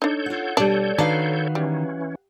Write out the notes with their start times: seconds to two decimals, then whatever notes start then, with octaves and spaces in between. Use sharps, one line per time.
0.02 D4 D#4 A4 C#5 G6
0.26 F4 F#5
0.57 B2 G3 D4
0.98 D#3 D4 F#4 B4 F5
1.55 E3 G3 C#4